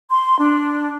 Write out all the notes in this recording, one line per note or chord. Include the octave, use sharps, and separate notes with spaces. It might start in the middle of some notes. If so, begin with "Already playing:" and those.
C6
D4